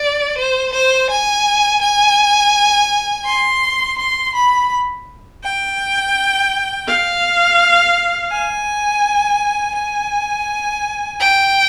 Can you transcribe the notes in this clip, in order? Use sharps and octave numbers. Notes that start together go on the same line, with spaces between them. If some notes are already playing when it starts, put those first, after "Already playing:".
Already playing: D5
C5
C5
G#5
G#5
C6
C6
B5
G5
F5
G#5
G#5
G5